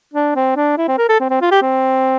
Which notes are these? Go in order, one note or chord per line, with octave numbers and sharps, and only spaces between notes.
D4
C4
D4
E4
C4
A#4
A4
C4
C4
F4
G4
C4